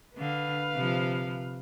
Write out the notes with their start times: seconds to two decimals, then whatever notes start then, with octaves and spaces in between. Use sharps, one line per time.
0.17 D3 B4 F5
0.74 C3 F3